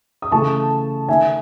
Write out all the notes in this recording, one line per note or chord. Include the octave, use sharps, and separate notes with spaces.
D#6
C#3 E3 A3 A5 C#6
D#3 A3 E5 G#5